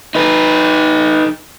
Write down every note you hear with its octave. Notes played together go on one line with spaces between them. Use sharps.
D#4 B4